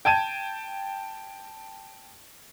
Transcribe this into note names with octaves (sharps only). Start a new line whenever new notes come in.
G5 A5 G#6 D#7